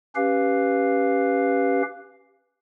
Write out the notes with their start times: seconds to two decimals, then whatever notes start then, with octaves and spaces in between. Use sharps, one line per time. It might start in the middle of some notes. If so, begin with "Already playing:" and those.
0.16 C#4 G4 B4 F5